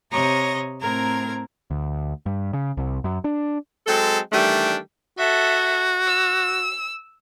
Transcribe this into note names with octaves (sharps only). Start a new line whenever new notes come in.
C3 C#5 D#5 A#5 A#6
A2 C4 A#4 A#5 G#6
D2
G2
C#3
C2
F#2
D4
F#3 G#3 C4 A4
D#3 E3 G3 A3 D4
F#4 A4 E5
E6